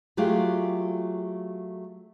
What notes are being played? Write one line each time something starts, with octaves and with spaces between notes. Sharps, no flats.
F#3 A3 F4 G4 G#4